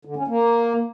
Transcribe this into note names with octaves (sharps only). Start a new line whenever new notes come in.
D3
C#4
A#3